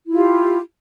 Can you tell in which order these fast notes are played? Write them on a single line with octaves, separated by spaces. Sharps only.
E4 F4 G4